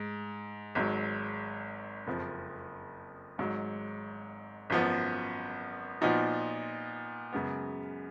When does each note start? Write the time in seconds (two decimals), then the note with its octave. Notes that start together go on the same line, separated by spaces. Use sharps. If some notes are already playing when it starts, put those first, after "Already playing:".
Already playing: G#2
0.75 G#1 G#2 F#3
2.07 F#1 F2 F3
3.38 G#1 G#2 F#3
4.70 G#1 F#2 F3 B3
6.01 A#2 F3 B3 D#4 F#4
7.33 F#2 C#3 G#3 B3